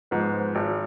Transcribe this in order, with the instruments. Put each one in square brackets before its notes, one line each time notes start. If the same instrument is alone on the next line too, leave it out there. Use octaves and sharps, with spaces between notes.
[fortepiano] G#2 F3 B3
G#1